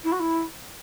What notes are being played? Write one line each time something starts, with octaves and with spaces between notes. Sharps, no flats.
E4
F#4
E4